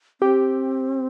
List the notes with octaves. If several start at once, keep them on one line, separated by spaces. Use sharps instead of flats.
C4 G4